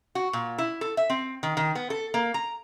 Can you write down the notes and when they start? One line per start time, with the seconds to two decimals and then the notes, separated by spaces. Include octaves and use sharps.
0.15 F#4
0.33 A#2
0.58 E4
0.81 A4
0.97 E5
1.10 C4
1.43 D#3
1.57 D#3
1.75 B3
1.90 A4
2.14 A#3
2.34 A#5